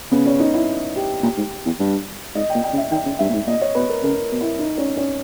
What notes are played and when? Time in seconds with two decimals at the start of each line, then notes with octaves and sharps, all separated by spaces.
0.11 C#3 B3
0.26 C#4
0.40 D#4
0.54 E4
0.96 G4
1.23 A#2
1.37 G#2
1.66 E2
1.79 G2
2.35 G#2 D#5
2.50 G5
2.55 A#2
2.64 G5
2.73 C#3
2.78 E5
2.91 D#3 G5
3.05 C#3
3.19 G2 E5
3.29 A#2
3.34 G#2
3.47 A#2 D#5
3.62 C#5
3.75 B2 B4
3.89 A#4
4.03 C#3 A#4
4.32 B2
4.41 E4
4.59 D#4
4.78 C#4
4.97 C#4